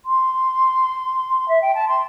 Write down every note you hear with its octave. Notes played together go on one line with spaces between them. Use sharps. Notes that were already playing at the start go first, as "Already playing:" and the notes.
C6
E5
G5
A5
C6